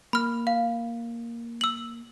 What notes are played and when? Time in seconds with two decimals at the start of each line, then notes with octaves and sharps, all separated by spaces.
0.13 A#3 B5 F6
0.47 F5
1.61 E6 F#7